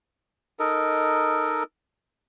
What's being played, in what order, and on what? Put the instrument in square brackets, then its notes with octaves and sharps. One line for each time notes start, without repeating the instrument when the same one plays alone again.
[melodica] D#4 A4 A#4 D#5